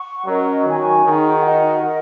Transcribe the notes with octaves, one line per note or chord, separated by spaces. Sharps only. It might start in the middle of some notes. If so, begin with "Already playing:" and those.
Already playing: F#5 C#6
F#3 C#4 A#4 D#5
D#3 F#4 C#5 G#5 C#6
D#3 D#4 G#4 F#5
F#4 D#5 F#5
A#4 D#5